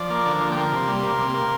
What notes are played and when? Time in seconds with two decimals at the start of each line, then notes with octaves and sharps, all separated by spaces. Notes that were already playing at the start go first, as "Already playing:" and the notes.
Already playing: F3 D5
0.10 A#3
0.26 D3
0.41 F3
0.52 G5
0.57 A#3
0.72 C3 C6
0.88 G3
1.03 A#3
1.18 C3
1.34 A#3